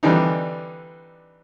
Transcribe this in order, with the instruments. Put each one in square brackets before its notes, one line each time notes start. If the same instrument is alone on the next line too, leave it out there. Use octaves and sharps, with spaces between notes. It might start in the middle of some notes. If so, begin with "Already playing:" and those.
[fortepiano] D3 E3 G3 C4 D4 D#4